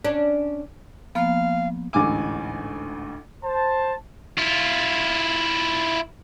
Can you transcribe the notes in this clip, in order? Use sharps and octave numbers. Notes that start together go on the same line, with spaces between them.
C#4 D4
F3 A#3 B3 F5
A1 D2 G#2 G#5 D6
C5 A5
E4 F4